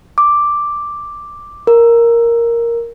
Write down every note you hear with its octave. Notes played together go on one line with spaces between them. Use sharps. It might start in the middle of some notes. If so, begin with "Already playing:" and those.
D6
A#4